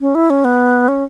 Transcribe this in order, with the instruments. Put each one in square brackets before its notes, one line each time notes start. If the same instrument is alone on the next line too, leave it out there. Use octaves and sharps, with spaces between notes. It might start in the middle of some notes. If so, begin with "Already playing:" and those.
[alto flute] C#4
E4
C#4
B3
C#4